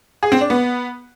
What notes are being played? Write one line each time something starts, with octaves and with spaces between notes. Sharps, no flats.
G#4
C4
D4
B3